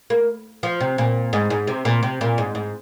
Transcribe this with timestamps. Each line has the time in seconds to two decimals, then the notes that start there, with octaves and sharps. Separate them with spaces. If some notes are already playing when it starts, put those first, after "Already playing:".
0.10 A#3
0.63 F3
0.81 C3
0.98 A#2
1.33 G#2
1.50 G#2
1.67 C3
1.85 A#2
2.03 C3
2.21 A#2
2.38 G#2
2.55 G#2